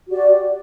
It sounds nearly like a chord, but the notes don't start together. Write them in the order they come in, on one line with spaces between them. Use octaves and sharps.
F#4 G4 D5